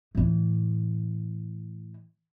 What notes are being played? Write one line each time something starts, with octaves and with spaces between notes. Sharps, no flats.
A2 E3